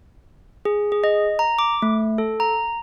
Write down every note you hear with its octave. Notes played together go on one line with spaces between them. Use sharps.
G#4
G#4
D#5
A#5
D6
A3
A4
A#5